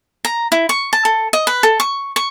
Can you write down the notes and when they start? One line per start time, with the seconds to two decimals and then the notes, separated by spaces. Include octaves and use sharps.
0.25 A#5
0.52 E4
0.69 C#6
0.93 A5
1.05 A4
1.33 D#5
1.47 B4
1.63 A4
1.80 C#6
2.16 C#6